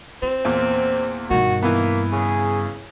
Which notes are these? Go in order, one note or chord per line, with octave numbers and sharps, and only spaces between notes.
C4 F4
E2 A#2
G2 B2 D#3 F#4
E3 A#3 B3
C#3 G#4